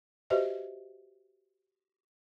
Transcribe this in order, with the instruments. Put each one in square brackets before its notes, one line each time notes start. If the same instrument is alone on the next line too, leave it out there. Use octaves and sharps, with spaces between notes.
[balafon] F#4 G4 B4 C5 D#5 E5